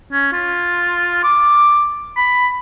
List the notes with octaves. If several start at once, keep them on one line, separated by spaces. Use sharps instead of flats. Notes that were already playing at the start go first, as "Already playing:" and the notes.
C#4
F4
D6
B5